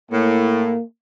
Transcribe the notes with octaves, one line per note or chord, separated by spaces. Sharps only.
A2 A#3